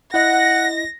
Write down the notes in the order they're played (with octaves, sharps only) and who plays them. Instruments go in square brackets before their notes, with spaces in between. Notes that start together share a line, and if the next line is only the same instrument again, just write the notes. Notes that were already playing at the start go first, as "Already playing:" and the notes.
[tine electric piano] E4 D#5 [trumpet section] F#5 [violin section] A#6